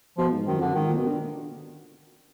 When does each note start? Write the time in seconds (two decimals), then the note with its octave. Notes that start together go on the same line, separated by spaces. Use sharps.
0.18 B2 F3
0.33 G#2
0.47 F#2 D#3
0.58 F2 D3
0.68 F#2
0.75 G#2 D#3
0.88 A#2
0.97 B2
1.07 D3